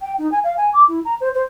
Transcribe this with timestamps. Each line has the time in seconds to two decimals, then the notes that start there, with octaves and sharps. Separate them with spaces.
0.01 G5
0.19 D#4
0.32 G#5
0.44 F5
0.57 G#5
0.74 D6
0.88 E4
1.05 A#5
1.21 C5
1.35 C5